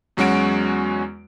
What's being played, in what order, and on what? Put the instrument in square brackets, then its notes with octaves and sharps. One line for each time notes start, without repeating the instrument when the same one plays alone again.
[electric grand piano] E2 F#3 G#3 C#4 F#4 D7